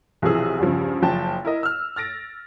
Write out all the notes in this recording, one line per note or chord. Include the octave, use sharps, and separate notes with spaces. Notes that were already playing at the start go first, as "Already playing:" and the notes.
B1 C3 E3 F3 G#4 E6
E2 G2 C#3 F3
F#1 F3 G5 A5 A6
E4 A#4 D#5
E6 F6
F6 A6 A#6 D7